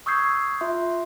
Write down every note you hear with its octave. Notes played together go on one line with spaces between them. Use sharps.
C#6 D#6 E6 G6 G#6 C7
F4 E5 C6